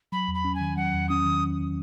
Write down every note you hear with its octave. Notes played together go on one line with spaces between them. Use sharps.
F#3 B5
E2
B5
C#4
G#5
D#3
F#3 F#5
E2
C#4 D#6
D#3